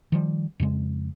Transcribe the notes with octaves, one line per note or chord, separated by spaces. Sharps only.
D#3 F3 G3
F2 C#3 G#3